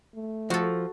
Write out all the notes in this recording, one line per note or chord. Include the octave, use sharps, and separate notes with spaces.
A3
F3 F#4 A4